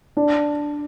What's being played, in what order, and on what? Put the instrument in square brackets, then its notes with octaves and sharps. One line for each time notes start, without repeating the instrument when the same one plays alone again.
[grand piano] D4